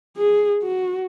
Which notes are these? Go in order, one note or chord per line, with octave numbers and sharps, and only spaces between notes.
G#4
F#4